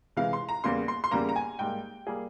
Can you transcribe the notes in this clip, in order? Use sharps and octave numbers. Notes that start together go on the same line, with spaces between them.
C3 E3 G#3 F5
C6
A#5
E2 C#3 G3 A#3 C6
C6
C6
E2 C#3 G3 A#3 A#5
A#5
G#5
G#2 G3 A#3 G5
G3 A#3 G#4